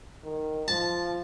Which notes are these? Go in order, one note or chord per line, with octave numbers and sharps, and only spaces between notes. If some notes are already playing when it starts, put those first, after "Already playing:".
D#3
F3 A5